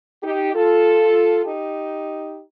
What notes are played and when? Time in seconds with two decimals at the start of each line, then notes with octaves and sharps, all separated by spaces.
0.23 D#4 G4
0.54 F4 A4
1.45 D#4 G4